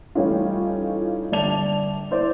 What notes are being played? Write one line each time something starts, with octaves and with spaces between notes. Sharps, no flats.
E3 G3 A3 C#4 D#4 F4
G1 D5 A5 F7
E4 C5 D5